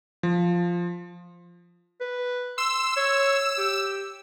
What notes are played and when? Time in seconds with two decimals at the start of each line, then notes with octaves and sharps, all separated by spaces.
0.23 F3
2.01 B4
2.58 C6 E6
2.97 C#5
3.58 G4